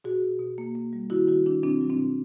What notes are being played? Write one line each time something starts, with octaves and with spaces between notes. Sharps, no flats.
B2 F#4 G#4
B2
B2
A#3
A#3
G3
D#3 E4 F#4
D#3 E4 F#4
D#3 D4 E4
B2 C4 D4
F#3
C4 D4
B2